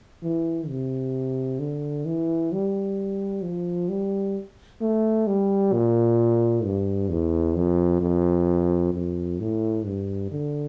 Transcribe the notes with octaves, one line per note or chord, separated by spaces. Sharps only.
E3
C3
D3
E3
G3
F3
G3
A3
G3
A#2
G2
E2
F2
F2
F2
A2
G2
D3